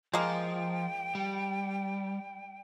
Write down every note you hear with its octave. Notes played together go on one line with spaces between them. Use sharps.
F3 G#3 A#3 G5
G3